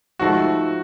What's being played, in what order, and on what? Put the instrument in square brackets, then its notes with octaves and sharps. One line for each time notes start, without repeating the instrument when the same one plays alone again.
[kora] G#2 F3 A3 [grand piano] F#4